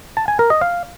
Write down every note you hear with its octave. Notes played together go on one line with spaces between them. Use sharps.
A5
G#5
A#4
D#5
F5